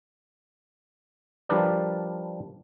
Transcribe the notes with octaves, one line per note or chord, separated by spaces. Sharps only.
F3 G3 D4 A#4 B4 D5